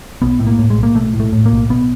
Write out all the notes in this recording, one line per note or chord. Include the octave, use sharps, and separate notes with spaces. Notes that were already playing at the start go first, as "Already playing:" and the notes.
B1 B3
A2
A#3
A2
G#3
B1
A#3
B1 A3
A2
A3
A2
A#3
B1
B1 B3